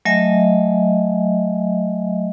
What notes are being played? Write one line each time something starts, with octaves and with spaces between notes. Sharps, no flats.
F#3 A3 D#5 E5 G#5